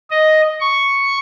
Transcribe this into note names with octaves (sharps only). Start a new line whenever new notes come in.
D#5
C#6